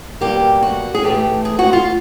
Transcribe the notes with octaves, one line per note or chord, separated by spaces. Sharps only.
B2 G3 A#3 G4
F#4
G#4
A2 E3 A3 G4
G#4
F#4
F4